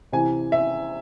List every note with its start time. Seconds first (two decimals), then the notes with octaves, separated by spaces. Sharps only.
0.12 C3 E3 G#5
0.52 E5